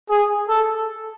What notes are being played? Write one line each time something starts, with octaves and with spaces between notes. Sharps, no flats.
G#4
A4